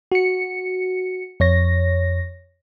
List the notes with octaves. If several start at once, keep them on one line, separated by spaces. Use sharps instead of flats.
F#4 C#7
F2 C#5 A#6